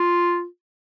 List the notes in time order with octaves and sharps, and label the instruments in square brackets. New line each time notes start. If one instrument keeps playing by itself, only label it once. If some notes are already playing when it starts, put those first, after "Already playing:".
Already playing: [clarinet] F4